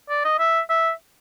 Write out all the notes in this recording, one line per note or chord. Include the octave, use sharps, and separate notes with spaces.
D5
D#5
E5
E5